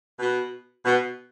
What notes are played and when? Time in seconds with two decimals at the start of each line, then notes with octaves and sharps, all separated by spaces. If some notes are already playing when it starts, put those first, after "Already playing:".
0.19 B2
0.85 B2